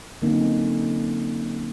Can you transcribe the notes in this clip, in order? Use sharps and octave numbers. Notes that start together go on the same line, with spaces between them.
D3 F#3 A#3 C4 C#4 D#4